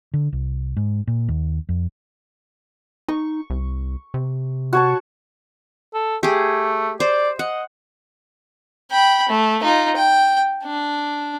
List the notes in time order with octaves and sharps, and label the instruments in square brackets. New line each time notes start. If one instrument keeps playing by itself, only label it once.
[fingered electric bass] D3
C2
G#2
A#2
D#2
F2
[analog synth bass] D#4 [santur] C#6
[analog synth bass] C2
C3
[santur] F#4 C#5 A5
[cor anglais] A4
[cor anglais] A3 [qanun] G4 G#4
[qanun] C5 [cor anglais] D5
[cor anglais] D#5 [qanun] F#5
[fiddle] G5 B5
A3
D#4 F4
G5
D4